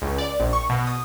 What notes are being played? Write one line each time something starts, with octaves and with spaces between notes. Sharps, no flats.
C#2
D5
A#1
C#6
B2
D#6